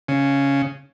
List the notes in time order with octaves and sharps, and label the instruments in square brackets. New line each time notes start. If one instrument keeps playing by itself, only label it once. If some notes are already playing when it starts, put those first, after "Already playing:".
[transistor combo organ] C#3